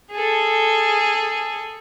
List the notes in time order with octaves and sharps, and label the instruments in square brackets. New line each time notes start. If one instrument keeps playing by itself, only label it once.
[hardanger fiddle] G#4 A4